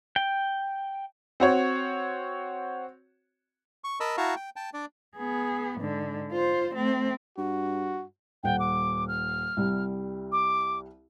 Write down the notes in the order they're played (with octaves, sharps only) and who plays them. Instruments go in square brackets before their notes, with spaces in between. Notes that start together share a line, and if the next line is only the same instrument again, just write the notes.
[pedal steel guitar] G5
[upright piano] C4 F#4 C#5
[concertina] C#6
A#4 D#5 A5 B5 E6
E4 F#4 F5 A5 A#5 C#6
G5
G5 A5
D4 D5
[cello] B3 G#4
G#2 D3
F4 C5
A3 C4
[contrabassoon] G2 [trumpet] F#4
[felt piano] D#1 F#5 [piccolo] G5
[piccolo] D6
F6
[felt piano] C2 G3
[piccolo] D6